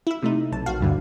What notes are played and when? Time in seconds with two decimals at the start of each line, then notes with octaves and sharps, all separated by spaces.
0.07 E4 E5
0.23 C3 A3 D#4
0.52 B1 A5
0.66 A#1 F#4 F5
0.81 D2 G2 D3